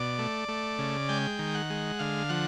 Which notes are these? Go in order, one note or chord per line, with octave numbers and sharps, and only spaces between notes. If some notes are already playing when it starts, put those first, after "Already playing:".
Already playing: B2 D5
A3
A3
C#3
G#3 G5
D#3
F#5
G#3
D3 F5
F3 F#5